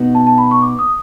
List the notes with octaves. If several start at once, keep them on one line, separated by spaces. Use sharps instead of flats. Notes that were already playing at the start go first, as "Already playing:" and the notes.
Already playing: B2 B3 D#4 F#4
A5
A5
B5
C#6
D6
D#6